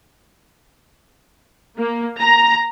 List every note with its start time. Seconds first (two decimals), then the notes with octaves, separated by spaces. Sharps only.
1.77 A#3
2.18 A#5